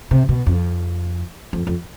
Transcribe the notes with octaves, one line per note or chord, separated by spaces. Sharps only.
C3
B2
F2
F2
F2